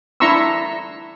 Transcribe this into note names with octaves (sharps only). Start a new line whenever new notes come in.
D4 E4 A#5 C6 C#6 E6